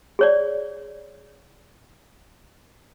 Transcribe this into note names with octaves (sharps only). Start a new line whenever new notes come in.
G#4 C#5 D5